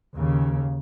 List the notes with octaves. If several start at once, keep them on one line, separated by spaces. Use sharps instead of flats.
D#2 C#3